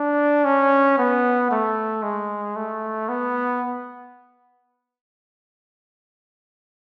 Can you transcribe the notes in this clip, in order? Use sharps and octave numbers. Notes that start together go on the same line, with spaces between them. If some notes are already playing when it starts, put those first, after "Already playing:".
Already playing: D4
C#4
B3
A3
G#3
A3
B3